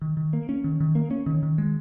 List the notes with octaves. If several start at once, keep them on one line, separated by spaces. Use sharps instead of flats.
D#3
D#3
A#3
C#4
D#3
D#3
A#3
C#4
D#3
D#3
G#3